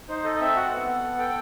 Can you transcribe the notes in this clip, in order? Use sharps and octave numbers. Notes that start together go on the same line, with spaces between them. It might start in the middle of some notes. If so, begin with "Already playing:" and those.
D#4 C5
A4 D#5
D#5
C4 E5
F#4 F#5
B3
A4
B3
A4 G5